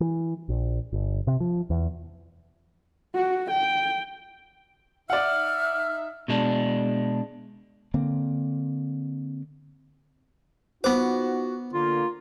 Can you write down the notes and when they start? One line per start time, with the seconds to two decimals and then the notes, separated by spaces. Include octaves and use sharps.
0.01 E3
0.49 A#1
0.93 G1
1.27 C3
1.40 F3
1.70 E2
3.15 F#4
3.50 G5
5.10 D#4 D5 E5 F#5 F6
6.28 B2 G#3 D4
7.94 D3 A#3 C4
10.84 B3 D#4 F4 F#4 C5 D6
11.73 D3 A#3 F4